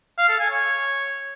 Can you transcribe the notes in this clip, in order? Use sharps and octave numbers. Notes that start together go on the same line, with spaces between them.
F5
A4
G#5
C#5